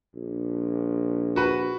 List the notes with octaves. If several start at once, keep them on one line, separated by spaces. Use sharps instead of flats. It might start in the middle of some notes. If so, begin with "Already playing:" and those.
A#1
F#4 B4